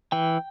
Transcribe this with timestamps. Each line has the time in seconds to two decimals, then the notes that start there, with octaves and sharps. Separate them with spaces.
0.12 E3 G5